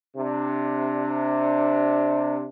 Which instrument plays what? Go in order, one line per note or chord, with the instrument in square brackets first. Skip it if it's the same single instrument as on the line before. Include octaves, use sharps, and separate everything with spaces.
[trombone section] C3 D4